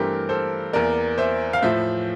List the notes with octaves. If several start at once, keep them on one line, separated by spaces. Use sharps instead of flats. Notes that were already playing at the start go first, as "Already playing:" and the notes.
Already playing: G2 E3 A3 C4 G4 A#4
A4 C5
E2 E3 A#3 A#4 D5
C5 E5
F5
A2 F3 A3 C5 E5